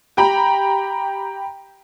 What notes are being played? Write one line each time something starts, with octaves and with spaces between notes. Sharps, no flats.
G4 G5 A#5 B5